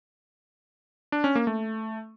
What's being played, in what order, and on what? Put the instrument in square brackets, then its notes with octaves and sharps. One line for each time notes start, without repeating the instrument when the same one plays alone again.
[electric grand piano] D4
C#4
A#3
A3